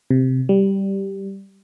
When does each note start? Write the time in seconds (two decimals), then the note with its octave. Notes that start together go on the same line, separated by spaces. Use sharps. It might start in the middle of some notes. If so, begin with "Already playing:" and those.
0.11 C3
0.49 G3